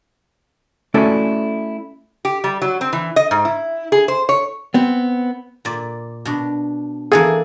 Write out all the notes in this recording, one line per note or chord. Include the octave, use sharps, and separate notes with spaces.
A3 C#4 E4 F#4 A4 D5
G4
G3
F#3
C4
E3
D#5
G#2
E4
G#4
C5
C#5
B3 C4
A#2 D5
B2 D4
E3 A#3 G#4 A4